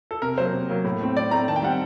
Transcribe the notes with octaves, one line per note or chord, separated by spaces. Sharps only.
A4
C3 A#4
F#3 A#3 C5
C3
F#3 A#3
A2
A3 C4
A2 D5
A3 C4 A#5
D#3 A5
G5
G3 C4 F#5